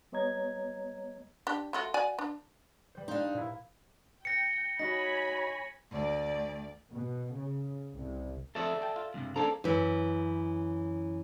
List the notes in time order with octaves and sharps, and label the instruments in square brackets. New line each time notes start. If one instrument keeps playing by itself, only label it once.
[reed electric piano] G3 B3 C#5 D#5 A#5 G#6
[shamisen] D4 G4
A3 F4 F#4
F#4 D5 G#5
D4
[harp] G3 C5
[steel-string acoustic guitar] D4 D#4 [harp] F5 C6
[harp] A#2 E4
[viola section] G5 [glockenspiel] A#6 C#7
[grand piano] D#4 F#4 [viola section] C#5 G#5 B5 [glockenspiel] A#6
[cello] D2 [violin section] D5
[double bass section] B2
C#3
C2
[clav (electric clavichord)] F2 A3 [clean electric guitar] A4 D5 E5
[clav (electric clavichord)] G5 A5
F4
[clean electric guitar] E2 G2 C3
[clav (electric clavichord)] F3 A#3 [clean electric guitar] C#4 D5 A#5 [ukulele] D4 A4
[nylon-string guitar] F#2 E3